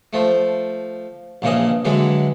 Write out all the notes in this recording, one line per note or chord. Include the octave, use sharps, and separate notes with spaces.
F3 A3
A#1 A#2 C#3 E3 D#5
D3 E3 F#3 G#3